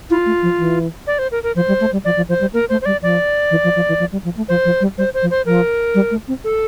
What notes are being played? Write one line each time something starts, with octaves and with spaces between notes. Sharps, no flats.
E4 F4
A3
F3
E3
D5
C5
A#4
A#4
F3 C5
G3
A3
G3
F3 D5
F3
F3 C5
G3
A#3 A#4
A3 C5
C5
G3 D5
F3 D5
E3
F3
F3
E3
F3
G3
F3
A3
F3 C5
F3
G3
G3 C5
C5
F3
C5
F3 A#4
G3
A3
C4
A4